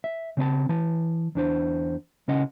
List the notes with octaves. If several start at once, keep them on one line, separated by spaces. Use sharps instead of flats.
E5
C#3 C4 D5 A5
E3 A5
E2 D4 C5
C#3 C#4 D#5 F#5